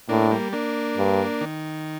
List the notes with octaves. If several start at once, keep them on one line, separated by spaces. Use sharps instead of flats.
A2 A#3 D4
G3 A#3
A#3 D4
G2
D#3